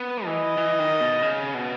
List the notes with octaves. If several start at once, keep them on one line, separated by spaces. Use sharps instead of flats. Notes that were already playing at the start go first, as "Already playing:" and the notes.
Already playing: B3
E3 D#5
E3
D#3
B2
C#3
B2